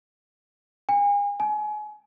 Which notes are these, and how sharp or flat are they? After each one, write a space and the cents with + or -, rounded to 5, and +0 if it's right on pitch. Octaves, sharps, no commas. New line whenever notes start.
G#5 -40
G#5 +30